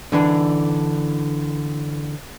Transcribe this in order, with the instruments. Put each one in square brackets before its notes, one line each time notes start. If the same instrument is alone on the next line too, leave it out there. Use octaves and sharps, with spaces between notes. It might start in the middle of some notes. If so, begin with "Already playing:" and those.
[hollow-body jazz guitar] D3 E3 D4